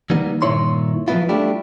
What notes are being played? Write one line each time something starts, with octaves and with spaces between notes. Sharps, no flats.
E3 G3 A#3 B3 D#4
G2 A#2 D#3 E4 C#5 C6
F3 F#3 G#3 B3 E4 F4
G3 A3 D4 E4 F4 G4